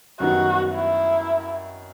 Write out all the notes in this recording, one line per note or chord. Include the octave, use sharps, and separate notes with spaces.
F#2 D#3 G3 B3 D#4 F#4
E4